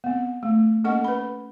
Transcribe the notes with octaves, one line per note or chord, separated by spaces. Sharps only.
B3 C4
A3
A#3 C#4 A4 D#5 F#5 C#6
B4 B5